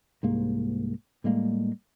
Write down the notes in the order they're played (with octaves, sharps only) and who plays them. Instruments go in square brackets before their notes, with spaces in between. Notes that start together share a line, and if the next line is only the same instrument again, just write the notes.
[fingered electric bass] C2 G#2 A#3
A2 G3 G#3 A#3